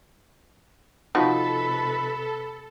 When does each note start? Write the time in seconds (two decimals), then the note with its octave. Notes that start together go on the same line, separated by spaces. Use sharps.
1.15 C3 F3 D#4 F#4 A4 B4